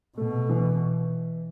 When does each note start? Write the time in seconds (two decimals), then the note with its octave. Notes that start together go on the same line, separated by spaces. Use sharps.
0.18 B2 A3
0.49 E3